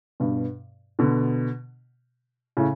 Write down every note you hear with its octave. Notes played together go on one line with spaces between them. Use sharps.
G2 B2
B2 D3
A2 C#3